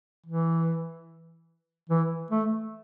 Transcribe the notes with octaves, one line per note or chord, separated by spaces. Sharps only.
E3
E3
A3